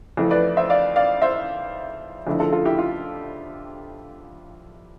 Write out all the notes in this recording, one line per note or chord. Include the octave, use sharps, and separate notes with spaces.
F2 E3 A3 E4
B4 D5
C5 E5
D5 F5
D5 F5
C5 E5
F2 D3 A3 E4
F4 A4
F4 A4
E4 G4
F4